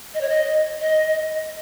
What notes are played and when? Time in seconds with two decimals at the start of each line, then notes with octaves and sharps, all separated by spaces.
0.14 D#5
0.21 C#5
0.29 D#5
0.81 D#5